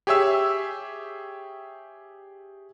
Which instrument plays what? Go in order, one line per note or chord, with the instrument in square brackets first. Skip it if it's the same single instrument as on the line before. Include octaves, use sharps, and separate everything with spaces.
[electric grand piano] G4 G#4 C#5 E5 E6